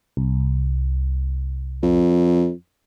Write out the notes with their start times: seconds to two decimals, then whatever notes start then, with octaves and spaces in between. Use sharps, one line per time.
0.17 C2
1.83 F2